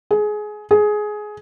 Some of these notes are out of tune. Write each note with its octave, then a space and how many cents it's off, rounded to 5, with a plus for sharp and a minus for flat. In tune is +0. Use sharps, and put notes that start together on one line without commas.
G#4 +20
G#4 +15